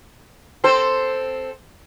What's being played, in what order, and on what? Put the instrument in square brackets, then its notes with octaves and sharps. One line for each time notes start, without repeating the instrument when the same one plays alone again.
[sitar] C4 A4 C5